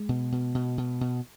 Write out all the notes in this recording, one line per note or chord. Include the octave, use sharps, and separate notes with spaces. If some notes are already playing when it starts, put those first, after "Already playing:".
Already playing: G#3
B2
B2
B2
B2
B2